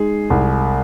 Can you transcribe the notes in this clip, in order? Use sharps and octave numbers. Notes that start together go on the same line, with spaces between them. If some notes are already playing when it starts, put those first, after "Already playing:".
Already playing: G#3 D#4 G#4
C2